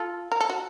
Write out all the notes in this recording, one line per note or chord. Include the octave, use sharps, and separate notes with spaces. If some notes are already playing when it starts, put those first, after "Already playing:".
Already playing: F4 A4
A#4
A4
F#4